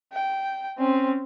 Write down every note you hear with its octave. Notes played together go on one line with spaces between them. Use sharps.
G5
C4 C#4